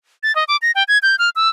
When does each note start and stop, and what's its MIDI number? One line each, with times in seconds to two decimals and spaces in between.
0.23 0.34 93
0.36 0.44 75
0.48 0.57 86
0.62 0.71 94
0.75 0.83 79
0.88 0.98 92
1.03 1.16 91
1.19 1.30 89
1.36 1.49 88